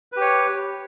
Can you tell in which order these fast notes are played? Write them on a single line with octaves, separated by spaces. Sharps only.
B4 G4 C#5